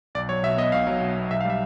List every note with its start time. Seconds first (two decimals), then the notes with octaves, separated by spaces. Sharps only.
0.15 B1 D5
0.29 F#3 C#5
0.43 B2 E5
0.57 B3 D#5
0.72 B1 F5
0.87 F#3
1.01 B2
1.16 B3
1.31 B1 E5
1.40 F5
1.45 G3 E5